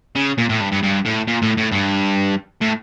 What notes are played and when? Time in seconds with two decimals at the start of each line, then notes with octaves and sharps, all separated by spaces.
0.16 C#3
0.38 A#2
0.49 A2
0.61 G2
0.72 G2
0.83 G2
1.05 A2
1.27 A#2
1.42 A2
1.58 A2
1.72 G2
2.62 A2